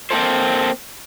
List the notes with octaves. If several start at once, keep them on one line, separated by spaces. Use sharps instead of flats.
A#3 C4 E4 G4 A4 C5